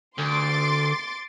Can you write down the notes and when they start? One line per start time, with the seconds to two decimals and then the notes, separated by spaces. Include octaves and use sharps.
0.19 D2 C6 D6 A6